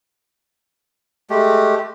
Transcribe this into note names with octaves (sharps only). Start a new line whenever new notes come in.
G#3 A3 G4